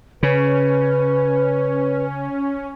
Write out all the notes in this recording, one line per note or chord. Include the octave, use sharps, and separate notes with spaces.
C#3 C#4 B4